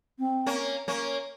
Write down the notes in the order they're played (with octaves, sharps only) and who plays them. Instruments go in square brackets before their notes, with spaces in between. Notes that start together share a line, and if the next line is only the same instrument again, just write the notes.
[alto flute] C4
[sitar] A#3 C#4
A#3 C#4